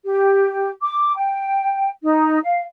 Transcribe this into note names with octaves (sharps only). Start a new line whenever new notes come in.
G4
D6
G5
D#4
F5